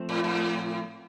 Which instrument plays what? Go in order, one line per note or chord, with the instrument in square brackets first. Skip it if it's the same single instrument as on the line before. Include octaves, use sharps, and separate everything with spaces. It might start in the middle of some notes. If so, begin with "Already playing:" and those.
Already playing: [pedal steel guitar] F3 A3 C4
[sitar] A2
A2